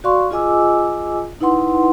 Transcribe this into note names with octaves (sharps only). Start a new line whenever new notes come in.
F#4 D5 F5 C6 C#6
F4 G#4 D#5 G#5 D6 E6
D#4 E4 B4 F#5 C6